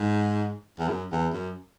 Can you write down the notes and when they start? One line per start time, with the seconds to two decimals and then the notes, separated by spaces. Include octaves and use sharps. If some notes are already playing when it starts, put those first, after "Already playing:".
Already playing: G#2
0.79 E2
0.88 F#2
1.12 E2
1.33 F#2